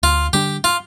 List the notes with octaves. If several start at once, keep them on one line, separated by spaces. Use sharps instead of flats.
D2 F4
D3 G3 D4 G4
F4